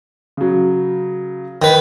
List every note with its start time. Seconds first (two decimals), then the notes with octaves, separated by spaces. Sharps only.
0.37 C#3 F#3
1.62 D#3 B4